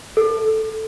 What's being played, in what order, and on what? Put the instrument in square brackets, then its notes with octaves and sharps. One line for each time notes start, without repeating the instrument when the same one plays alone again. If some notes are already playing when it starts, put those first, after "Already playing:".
[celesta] A4